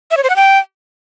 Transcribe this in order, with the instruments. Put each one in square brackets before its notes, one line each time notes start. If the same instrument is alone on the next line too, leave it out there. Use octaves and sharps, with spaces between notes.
[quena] E5
C#5
C5
F#5
G5